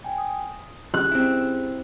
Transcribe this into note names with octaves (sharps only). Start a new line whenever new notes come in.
G5 G#5
D#6
C#4 G4 G#4 F#6
C4 E4